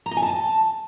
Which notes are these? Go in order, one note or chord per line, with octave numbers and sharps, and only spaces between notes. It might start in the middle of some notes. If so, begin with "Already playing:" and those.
A#5
D#5
G#5
A5